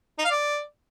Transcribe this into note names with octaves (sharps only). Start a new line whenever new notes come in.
D#4
F5
D5